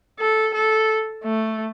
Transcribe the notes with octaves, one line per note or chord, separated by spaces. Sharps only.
A4
A4
A3